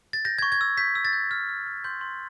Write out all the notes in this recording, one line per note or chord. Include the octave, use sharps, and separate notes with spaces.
A6
G6 A#6
C#6 G#6
G#6
E6
G6 B6
E6
A6
G6
F6
F6
F6
C6 G6
C6